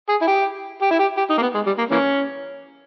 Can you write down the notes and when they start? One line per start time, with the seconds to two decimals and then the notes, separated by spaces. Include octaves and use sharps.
0.09 G#4
0.22 E4
0.27 G4
0.82 G4
0.91 E4
0.99 G4
1.17 G4
1.30 D#4
1.38 A#3
1.42 B3
1.54 G#3
1.66 G3
1.78 A#3
1.91 E3 A#3 C#4